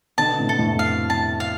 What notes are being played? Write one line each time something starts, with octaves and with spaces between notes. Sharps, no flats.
B2 D3 A5
A2 C3
A4
F2 A2
F5
A5
F5